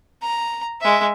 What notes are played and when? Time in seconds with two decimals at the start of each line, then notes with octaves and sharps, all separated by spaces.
0.22 A#5
0.81 G#3 E5